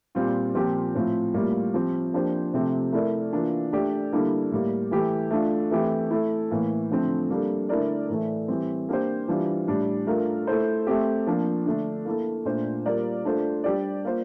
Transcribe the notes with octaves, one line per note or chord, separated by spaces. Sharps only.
A#2 G3 C4 F4
A#2 F3 C4 G4
A2 F3 C4 F4
A2 G3 A#3 F4
F3 C4 G4
F3 A#3 D4 G4 C5
C3 F3 A3 C4 G4
A3 E4 A#4 D5
E3 A#3 D4 F4
A3 D4 G4 D5
D3 G3 A#3 E4 A4
A2 G3 A#3
E3 A3 E4 G4
A3 D4 F4
E3 A3 C4 E4 G4
A3 E4 A4
A2 E3 A#3
D3 F3 A3 C4
G3 A#3 D4 A4
D3 A3 E4 A#4 D5
A2 E3 A3
E3 G3 C4
A#3 D4 G4 C5
E3 G3 D4 F4
A2 G3 D4
A3 D4 F4 A#4
A3 E4 A4 C5
A3 C4 G4
F3 A#3 D4
D3 A3 D4
A#3 E4 A4
A#2 A3 D4 A4 C5
G3 A#3 F4 A#4 D5
A3 D4 F4 A4 C5
G3 D4 G4 D5
A#3 F4 C5